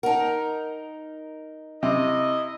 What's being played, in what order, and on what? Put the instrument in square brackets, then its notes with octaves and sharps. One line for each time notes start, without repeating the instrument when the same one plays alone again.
[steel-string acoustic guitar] D#4 A#4 [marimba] F#5 A5
[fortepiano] C3 [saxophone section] E4 D#5